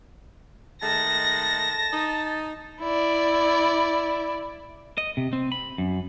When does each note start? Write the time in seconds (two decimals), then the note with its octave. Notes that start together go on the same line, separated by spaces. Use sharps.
0.82 D#3 G#3 A3 A5 A#6
1.93 D#4
2.81 E4 D5
4.98 D#5
5.17 C3
5.33 C4
5.52 B5
5.78 F#2